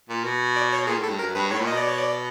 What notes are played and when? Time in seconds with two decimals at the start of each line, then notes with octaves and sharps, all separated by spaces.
0.09 A#2
0.24 B2
0.56 D5
0.73 C#5
0.87 A#2 G#4
0.99 A2
1.04 A4
1.09 G2
1.19 F#2 A#4
1.35 G2 B4
1.51 A2 C#5
1.61 A#2
1.67 D#5
1.72 B2
1.77 D5
1.88 C#5
1.98 D5